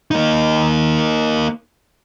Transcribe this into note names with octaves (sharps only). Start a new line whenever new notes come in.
A#3 D#4